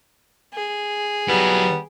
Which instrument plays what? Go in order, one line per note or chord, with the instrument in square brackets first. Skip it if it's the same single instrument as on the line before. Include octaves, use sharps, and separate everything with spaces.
[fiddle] G#4
[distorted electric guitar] F#3 E4 [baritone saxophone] G3 [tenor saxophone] B3